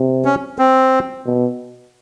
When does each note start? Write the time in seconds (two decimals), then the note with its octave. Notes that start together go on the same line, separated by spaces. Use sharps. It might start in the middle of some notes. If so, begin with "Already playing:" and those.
Already playing: C3
0.25 C#4
0.59 C4
1.26 B2